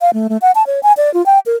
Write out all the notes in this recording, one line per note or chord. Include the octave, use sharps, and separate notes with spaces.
F5
A3
A3
F#5
A5
C#5
G#5
D5
F4
G5
A#4